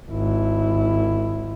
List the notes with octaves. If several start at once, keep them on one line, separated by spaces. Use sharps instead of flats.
G#1 E4